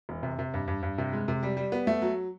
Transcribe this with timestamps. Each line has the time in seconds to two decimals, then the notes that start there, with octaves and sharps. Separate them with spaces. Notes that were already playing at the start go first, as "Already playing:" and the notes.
0.09 E1
0.23 C3
0.39 C3
0.54 G2
0.68 G2
0.83 G2
0.98 C3
1.13 G#3
1.28 C3
1.43 G3
1.57 G3
1.72 B3
1.87 A3
2.02 F#3